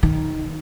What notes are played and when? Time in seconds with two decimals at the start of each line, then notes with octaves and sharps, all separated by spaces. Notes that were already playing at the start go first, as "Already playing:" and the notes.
0.03 D#3